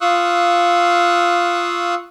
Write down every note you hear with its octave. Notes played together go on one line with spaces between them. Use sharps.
F4 F5 C#6 D#6 E6 F#6